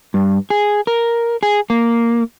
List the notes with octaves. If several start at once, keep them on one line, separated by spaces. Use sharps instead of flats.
G2
G#4
A#4
G#4
A#3